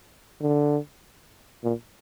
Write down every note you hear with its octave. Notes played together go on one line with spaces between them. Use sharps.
D3
A#2